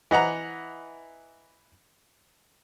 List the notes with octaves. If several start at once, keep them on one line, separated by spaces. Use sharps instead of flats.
E3 D#5 F#5 A#5